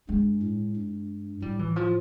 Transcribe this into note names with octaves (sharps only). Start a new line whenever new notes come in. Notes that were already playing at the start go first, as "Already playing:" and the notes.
G2 G#3
A2
G2
A2 G3
E3
F3